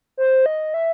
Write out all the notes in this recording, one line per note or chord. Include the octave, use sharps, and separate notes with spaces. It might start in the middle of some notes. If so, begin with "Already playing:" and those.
C5
D#5
E5